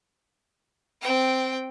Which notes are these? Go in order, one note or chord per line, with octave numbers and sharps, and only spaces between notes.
C4 G5